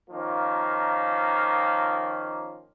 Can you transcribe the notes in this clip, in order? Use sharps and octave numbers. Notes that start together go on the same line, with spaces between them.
D#3 F3 A#3 C#4 F4